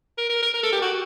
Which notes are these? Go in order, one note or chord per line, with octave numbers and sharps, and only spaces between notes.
A#4
A#4
A#4
A#4
A4
G4
F#4